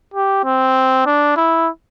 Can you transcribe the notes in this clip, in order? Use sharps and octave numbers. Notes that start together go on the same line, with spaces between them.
G4
C4
D4
E4